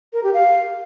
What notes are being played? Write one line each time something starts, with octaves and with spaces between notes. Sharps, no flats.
A#4
G4
F5